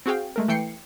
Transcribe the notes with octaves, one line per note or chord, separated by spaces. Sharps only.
C4 F#4 G#4 F5 G5
G#3 A3 A#4
E3 A3 G5 C7 C#7